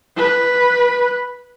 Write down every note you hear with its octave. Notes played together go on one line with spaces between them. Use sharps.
B4